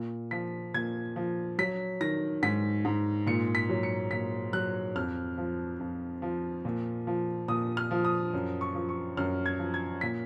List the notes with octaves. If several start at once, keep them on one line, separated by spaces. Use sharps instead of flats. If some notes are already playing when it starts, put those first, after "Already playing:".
Already playing: A#2
F3 B6
A#2 G#6
F3
F#3 B6
D#3 A#6
G#2 B6
G#2
A#2 C#7
B6
F#3
C#7
A#2 B6
F#3 F#6
F2 F6
F3
F2
F3
A#2
F3
A#2 D#6
F6
F3
D#6
F#2
C#6
F3
C#6
F#2 F6
G#6
F3
G#6
A#2 B6